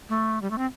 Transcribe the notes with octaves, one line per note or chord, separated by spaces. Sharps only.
A3
G3
A3
C4